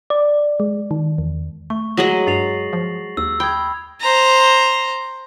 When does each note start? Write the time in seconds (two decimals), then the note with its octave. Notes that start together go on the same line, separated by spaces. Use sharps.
0.10 D5
0.60 G#3
0.91 D#3
1.18 E2
1.70 A3 C#6
1.97 F#3 G#3 D#5 A#6 F#7
2.27 G2 A6 C7 F7
2.73 F3
3.17 D#2 E6
3.40 G5 B5 D#6 G#6
4.00 C5 A#5